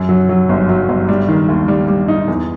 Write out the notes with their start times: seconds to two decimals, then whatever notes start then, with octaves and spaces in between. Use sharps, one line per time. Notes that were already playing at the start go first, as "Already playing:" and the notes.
Already playing: F#2
0.09 F#3
0.29 F#3
0.49 G1
0.69 F#3
0.89 G1
1.09 G3
1.29 D#3
1.48 D#2
1.68 G3
1.88 G3
2.08 D#4
2.28 E2